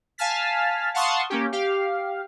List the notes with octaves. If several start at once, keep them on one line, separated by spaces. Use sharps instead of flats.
F5 G#5 A5 F6 A6 B6
F5 F#5 A5 C6 C#6 D#6
A#3 C#4 G4
G4 F5